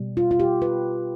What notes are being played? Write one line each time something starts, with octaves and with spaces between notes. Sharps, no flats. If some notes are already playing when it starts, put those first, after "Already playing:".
Already playing: B2 G3
F4
F4
G4
B4